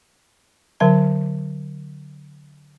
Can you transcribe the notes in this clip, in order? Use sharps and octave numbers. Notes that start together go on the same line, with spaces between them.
D3 F#3 A#4 A5